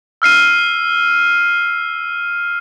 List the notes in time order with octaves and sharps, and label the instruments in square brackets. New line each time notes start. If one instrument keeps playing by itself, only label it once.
[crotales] E6 F6 C7 D#7